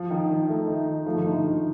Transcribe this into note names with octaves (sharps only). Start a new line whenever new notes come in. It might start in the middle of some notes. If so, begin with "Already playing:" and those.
Already playing: F3
D#3
D#3
A3
D#4
D#4
F3 A3
D#3
D3 D#4
D#3
D#4